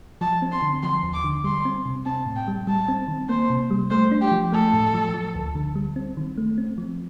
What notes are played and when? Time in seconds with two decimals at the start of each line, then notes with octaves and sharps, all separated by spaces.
0.21 F3 A5
0.42 C4
0.51 C6
0.62 D3
0.83 F3 C6
1.03 D#2
1.13 D6
1.24 D3
1.44 G3 C6
1.65 C4
1.85 C3
2.05 C4 A5
2.26 A2
2.36 G5
2.48 G3
2.67 G3 A5
2.88 C4
3.08 D#3
3.29 A#3 C5
3.50 C3
3.70 G3
3.90 A3 C5
4.12 D4
4.21 G4
4.32 F3
4.52 A3 A4
4.73 A2
4.94 F3
5.14 F3
5.35 D2
5.55 D3
5.75 G3
5.96 C4
6.17 D#3
6.37 A3
6.58 C4
6.78 F3